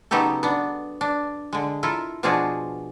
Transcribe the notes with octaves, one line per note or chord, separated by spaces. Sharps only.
C#3 F#3 B3 D#4 G4 A4
B3 D4
D4
D3 G#3
E4 F4 A4 A#4
B2 F3 D4 F4 F#4 G#4